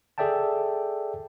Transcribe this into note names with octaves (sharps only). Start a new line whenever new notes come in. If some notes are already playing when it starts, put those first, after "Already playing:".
G#4 A4 D5 E5 G5 A5